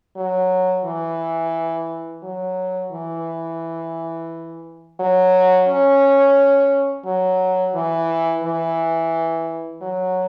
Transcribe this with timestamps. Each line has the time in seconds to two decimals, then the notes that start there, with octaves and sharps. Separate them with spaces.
0.17 F#3
0.85 E3
2.23 F#3
2.93 E3
5.00 F#3
5.68 C#4
7.06 F#3
7.75 E3
8.44 E3
9.82 F#3